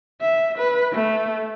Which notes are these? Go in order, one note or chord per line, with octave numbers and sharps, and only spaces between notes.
E5
B4
A3